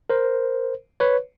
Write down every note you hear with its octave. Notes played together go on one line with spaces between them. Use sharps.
A#4 C5
B4 C#5